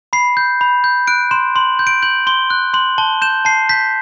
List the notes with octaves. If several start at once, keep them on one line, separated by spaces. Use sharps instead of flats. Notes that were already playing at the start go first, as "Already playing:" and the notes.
B5 C7
G6
B5
G6
F#6 D7
C6 E7
C6 F#7
G6
D7
G6 F#7
C6 G7
F#6
C6 F#7
A5 G7
G6 E7
A5 C7
G6 B6